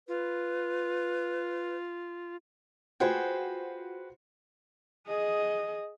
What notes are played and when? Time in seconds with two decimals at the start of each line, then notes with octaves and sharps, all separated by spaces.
0.08 F4 B4
3.00 F4 F#4 G#4 B4 C5 G5
5.07 G#4 D#5